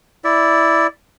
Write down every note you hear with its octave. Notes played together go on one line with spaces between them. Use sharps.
E4 D5